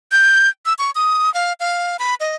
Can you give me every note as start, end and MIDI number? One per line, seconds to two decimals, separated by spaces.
0.12 0.49 91
0.66 0.74 88
0.79 0.91 85
0.95 1.32 87
1.34 1.53 77
1.60 1.97 77
1.99 2.15 83
2.20 2.36 75